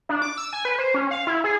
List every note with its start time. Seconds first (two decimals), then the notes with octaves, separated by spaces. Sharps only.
0.09 D4
0.22 D6
0.38 E6
0.53 G#5
0.65 B4
0.78 C5
0.94 C#4
1.11 F5
1.27 E4
1.44 G#4